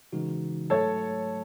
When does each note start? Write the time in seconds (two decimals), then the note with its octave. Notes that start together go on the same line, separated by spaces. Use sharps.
0.13 C#3 E3 G#3 D#4 F#4
0.70 G#2 F#3 A3 A4 C#5